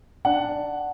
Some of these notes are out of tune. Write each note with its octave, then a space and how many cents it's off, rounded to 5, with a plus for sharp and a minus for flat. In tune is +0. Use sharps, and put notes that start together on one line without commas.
D4 +0 F#5 +0